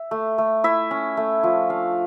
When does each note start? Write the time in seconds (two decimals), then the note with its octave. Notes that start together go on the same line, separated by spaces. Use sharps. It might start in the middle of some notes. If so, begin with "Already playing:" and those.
Already playing: E5
0.11 A3
0.38 A3
0.64 E4 E5
0.91 C#4
1.17 A3
1.43 F3
1.70 D4 F5